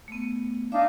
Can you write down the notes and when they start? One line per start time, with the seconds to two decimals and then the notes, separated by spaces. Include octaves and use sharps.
0.08 A3 B3
0.72 D4 D#4 E5 F5 D6